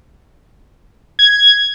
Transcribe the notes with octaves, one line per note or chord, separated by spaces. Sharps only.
G#6